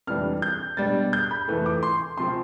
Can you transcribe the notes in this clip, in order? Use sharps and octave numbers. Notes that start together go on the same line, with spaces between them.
F2 C3 E3 G3 D4 F6
G6
B2 G3 D4 A6
G6
B5
F2 C3 E3 A3
D6
C6
C3 F3 C4 C6